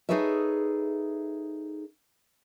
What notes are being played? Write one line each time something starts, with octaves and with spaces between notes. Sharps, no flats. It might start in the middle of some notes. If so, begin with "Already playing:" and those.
D#4 G#4 A4 B4 C#5 E5